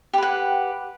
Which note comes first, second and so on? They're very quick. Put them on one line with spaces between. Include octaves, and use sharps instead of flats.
G4 B4 F#5